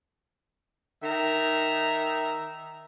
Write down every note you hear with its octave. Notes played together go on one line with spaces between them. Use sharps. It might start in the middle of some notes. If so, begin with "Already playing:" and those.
D#3 E5 A#5